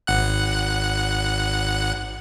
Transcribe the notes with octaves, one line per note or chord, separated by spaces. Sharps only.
G#1 F#5 F#6